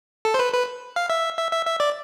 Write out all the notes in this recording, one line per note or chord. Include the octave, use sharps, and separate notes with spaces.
A4
C5
B4
B4
F5
E5
E5
E5
E5
D5